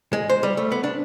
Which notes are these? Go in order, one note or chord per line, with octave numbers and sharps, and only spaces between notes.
G#3
C5
G3
A3
B3
D4